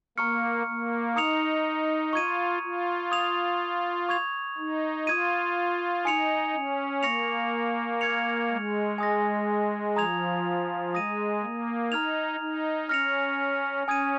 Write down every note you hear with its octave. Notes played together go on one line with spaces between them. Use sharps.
A#3 A#5 C#6 F6 C#7
A#3
D#4 A#5 D#6 C#7 F7
F4 C#6 G#6 D#7
F4
D#6 G#6 F7
C#6 G#6 F7
D#4
F4 D#6 G#6 D#7
D#4 G#5 D#6 C#7 F7
C#4
A#3 C#6 A#6 C#7 F7
F6 G#6 C#7 F7
G#3
G#5 D#6 A#6
F3 A#5 D#6 G#6 F7
G#3 D#6 A#6 D#7
A#3
D#4 A#5 F6 G#6 F7
D#4
C#4 F6 A#6 C#7 F7
C#4 G#5 D#6 G#6 D#7